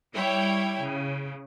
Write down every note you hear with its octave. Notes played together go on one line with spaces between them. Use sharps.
G3 E4 C#5 G5
C#3